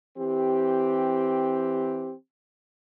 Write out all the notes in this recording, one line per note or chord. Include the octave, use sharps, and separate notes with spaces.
E3 C4 G4